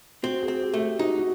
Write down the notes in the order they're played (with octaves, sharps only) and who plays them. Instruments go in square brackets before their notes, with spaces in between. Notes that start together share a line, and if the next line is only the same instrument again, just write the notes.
[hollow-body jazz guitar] C4 [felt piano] F#4
[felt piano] G#4
[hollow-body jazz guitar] C4
[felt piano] G4
[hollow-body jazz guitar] A3
[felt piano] G4
[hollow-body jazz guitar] D#4 [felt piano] F#4
[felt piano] F#4